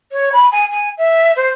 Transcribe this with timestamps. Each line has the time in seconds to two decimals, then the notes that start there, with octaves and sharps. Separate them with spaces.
0.12 C#5
0.33 B5
0.52 G#5
0.71 G#5
0.98 E5
1.36 C5